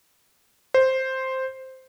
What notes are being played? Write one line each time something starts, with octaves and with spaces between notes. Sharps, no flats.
C5